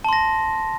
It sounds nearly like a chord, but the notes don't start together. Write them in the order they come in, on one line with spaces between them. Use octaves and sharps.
A5 C6 A#6